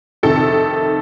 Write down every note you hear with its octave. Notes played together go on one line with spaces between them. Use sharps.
F2 C3 D#3 A4